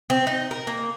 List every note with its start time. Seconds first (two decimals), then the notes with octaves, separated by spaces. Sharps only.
0.10 C4
0.27 D#4
0.51 A#4
0.67 A#3